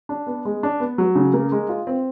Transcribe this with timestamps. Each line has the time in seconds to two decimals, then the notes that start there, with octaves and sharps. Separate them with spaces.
0.09 D4
0.27 B3
0.45 G#3
0.63 D4
0.80 B3
0.98 F#3
1.15 C#3
1.33 A#3
1.52 G#3
1.69 F4
1.87 C4